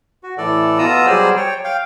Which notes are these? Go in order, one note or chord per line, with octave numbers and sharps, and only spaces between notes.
F#4
A2 E3 A4 D5
B2 B3 F4 A#5 D#6 E6
F#3 G3 G#4 C5 D5
C#5 G5
F5 G5